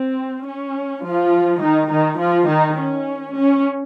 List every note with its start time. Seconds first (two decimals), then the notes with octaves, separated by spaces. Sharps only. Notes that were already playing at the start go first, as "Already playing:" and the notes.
Already playing: C4
0.46 C#4
1.04 F3 F4
1.62 D#3 D#4
1.90 D#3 D#4
2.19 F3 F4
2.49 D#3 D#4
2.78 C#4
3.36 C#4